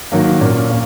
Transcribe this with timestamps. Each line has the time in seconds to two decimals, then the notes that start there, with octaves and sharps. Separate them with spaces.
0.12 D#3 F#3 A#3
0.41 A#2 A#3 C#4
0.70 A#3 C#4